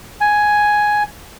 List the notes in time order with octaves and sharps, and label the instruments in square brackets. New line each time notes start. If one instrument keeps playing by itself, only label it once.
[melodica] G#5